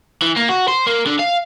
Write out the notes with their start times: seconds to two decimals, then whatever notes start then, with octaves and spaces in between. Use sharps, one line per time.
0.22 E3
0.36 A#3
0.49 F#4
0.68 C5
0.87 A#3
1.06 D3
1.20 F5